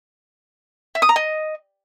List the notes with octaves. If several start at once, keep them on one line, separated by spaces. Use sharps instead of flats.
E5
D#6
A#5
D#5